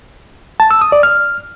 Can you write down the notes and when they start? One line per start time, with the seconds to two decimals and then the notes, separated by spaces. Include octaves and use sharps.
0.60 A5
0.71 E6
0.81 D#6
0.92 D5
1.03 F6